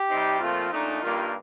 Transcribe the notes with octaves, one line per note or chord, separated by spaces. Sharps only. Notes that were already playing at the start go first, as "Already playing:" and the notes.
Already playing: G4
C3 G3 C4 D#4
A#2 F3 A3 C4 F4
A#2 A3 D4 D#4
G2 D#3 G3 A#3 F4